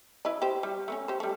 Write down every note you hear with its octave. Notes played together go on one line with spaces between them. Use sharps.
E4 B4 D#5
G4 C5
G3
A3 B3 C#4
G4 C5
G3 A3